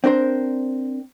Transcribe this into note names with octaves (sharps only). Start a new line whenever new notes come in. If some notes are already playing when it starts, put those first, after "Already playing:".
C4 D4 A#4 C5